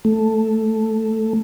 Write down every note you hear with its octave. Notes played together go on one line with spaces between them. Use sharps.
A3